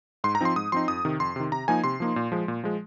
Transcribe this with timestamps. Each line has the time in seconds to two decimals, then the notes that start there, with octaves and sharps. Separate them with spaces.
0.24 G#2 C6
0.35 A#5
0.41 F3 C4 D#4 C6
0.56 G#2 D#6
0.72 F3 C4 D#4 C6
0.88 F2 D#6
1.05 C3 D#3
1.20 F2 C6
1.36 C3 D#3
1.52 C3 A#5
1.68 F3 A#3 D#4 G#5
1.84 C3 C6
2.00 F3 A#3 D#4
2.16 A#2
2.32 F3 G#3
2.48 A#2
2.64 F3 G#3